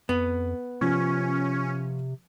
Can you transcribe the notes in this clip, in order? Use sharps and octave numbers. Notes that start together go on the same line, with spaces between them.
F2 B3
C3 F3 C#4